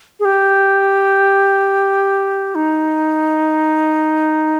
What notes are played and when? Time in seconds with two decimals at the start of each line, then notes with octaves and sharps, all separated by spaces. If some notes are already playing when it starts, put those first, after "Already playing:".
0.20 G#4
0.25 G4
2.55 D#4